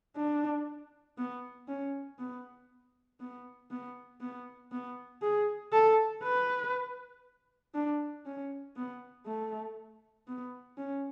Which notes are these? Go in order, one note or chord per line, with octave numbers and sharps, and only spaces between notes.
D4
B3
C#4
B3
B3
B3
B3
B3
G#4
A4
B4
D4
C#4
B3
A3
B3
C#4